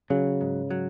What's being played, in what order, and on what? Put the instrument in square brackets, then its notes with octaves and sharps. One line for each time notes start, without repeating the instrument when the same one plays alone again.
[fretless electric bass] C#3 [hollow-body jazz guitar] F#3
[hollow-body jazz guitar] G#2
F#3